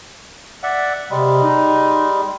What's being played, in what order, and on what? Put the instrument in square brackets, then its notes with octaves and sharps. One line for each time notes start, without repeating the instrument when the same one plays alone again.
[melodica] D5 E5 F#5
[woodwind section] C3 [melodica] G3 G#3
[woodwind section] D#4